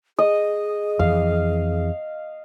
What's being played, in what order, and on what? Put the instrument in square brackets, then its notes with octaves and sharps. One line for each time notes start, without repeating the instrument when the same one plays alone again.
[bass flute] G#4 [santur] D#5
[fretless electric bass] F2 E3 [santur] F5